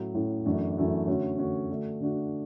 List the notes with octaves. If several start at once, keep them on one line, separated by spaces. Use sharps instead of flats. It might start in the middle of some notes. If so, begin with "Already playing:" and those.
Already playing: A2 F#3 C#4 E4
A2 F#3 C#4 E4
F#2 E3 A3 D4 F#4
F#2 E3 A3 D4 F#4
D3 A3 C#4 F#4
D3 A3 C#4 F#4
D3 A3 D4 F#4
D3 A3 D4 F#4